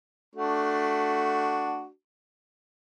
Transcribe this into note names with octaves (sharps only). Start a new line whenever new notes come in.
A3 D4 F#4